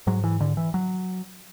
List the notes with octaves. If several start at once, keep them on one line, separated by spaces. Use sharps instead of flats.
G#2 F#3
E3
D3
E3
F#3